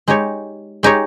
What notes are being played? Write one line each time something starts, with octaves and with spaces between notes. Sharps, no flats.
G#3 D#4 G4 C#5
G#3 D#4 G4 C#5